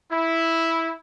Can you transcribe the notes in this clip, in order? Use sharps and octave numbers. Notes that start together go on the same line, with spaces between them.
E4